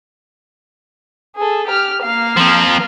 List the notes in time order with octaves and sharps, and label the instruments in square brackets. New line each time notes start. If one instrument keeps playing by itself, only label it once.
[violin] G#4 A4
G4 F6
A#3 F5
[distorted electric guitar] F3 C4